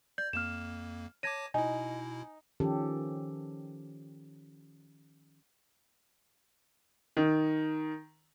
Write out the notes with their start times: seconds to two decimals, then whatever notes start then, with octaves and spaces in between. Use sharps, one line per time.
0.18 D5 G6
0.33 F2 A#3 F6 E7
1.23 C#5 A5 D6 G#6 A#6 D#7
1.54 B2 D#4 E4 G#5
2.60 D#3 F3 C#4 G4 A4
7.17 D#3